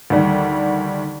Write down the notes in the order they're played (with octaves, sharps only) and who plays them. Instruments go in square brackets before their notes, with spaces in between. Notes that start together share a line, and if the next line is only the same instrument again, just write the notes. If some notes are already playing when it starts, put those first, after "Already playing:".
[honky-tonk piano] D2 D#3 G3 F#5